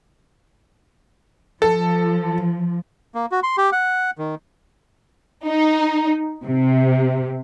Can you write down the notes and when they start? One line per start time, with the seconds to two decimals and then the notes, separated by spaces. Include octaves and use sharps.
1.62 F3 A4
3.15 A#3
3.32 F#4
3.43 C6
3.57 G4
3.72 F#5
4.18 D#3
5.46 D#4
6.45 C3